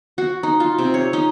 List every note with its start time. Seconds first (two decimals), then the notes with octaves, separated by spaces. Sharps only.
0.18 F#4
0.43 D#4
0.60 F4
0.79 C3
0.94 C#5
1.13 D#4